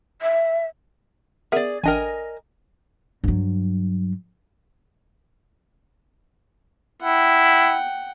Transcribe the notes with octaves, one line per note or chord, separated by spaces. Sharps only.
E5
B3 G#4 A#4 D5 E5
A1 D4 A#4 D#5 G5 G#5
G2 F#3
E4 F#5 G5